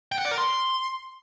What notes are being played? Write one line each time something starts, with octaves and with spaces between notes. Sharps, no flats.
G5
F#5
D5
A#4
C6